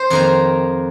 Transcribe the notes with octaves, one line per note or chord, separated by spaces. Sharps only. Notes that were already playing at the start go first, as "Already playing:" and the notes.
Already playing: C5
F2 D#3 A#3 A#4